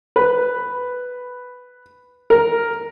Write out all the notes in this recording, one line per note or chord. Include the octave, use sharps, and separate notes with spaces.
B4
A#4